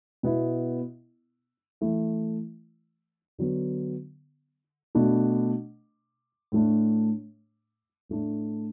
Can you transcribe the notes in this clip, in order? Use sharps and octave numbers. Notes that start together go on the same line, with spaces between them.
B2 B3 E4
E3 A3 E4
D3 F#3 B3
B2 A3 D4
A2 A3 D4
A2 A3 D4